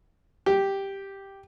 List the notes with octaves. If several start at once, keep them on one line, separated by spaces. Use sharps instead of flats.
G4